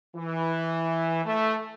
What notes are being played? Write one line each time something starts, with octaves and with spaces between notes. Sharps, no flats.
E3
A3